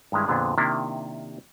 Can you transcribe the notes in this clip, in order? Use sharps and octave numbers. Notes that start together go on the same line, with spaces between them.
G2 D#3 G3 G#3 E4
F2 A#2 D3 B3 D4 G#4
C3 D#3 A#3 D4 E4